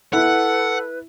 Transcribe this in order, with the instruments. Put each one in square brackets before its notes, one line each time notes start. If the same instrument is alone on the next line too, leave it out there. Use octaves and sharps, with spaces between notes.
[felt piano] E4 [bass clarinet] A4 [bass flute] B4 [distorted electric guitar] F#5